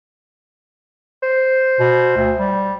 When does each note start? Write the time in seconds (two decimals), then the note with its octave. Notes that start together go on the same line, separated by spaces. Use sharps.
1.23 C5
1.80 B2
2.17 D2
2.39 G3